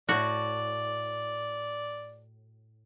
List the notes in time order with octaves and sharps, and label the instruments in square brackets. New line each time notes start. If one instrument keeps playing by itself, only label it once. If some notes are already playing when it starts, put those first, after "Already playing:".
[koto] A2 F#4 [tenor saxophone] D5